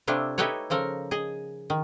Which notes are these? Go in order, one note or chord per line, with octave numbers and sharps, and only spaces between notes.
C3 A3 D4 E4 F4
D#4 E4 G4 A4 B4 C#5
C#3 F3 A4 A#4
G#4 D#5
D#3